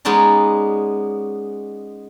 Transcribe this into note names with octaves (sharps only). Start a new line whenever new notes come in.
G#3 B3 C#4 D#4 D5